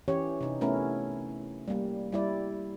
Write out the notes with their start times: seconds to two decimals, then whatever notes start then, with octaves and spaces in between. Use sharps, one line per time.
0.08 E3 C#4 G4 C#5
0.41 C3 D#4
0.61 A3 B3 C#4 E4 A#4
1.68 G3 A#3
2.12 G3 E4 D5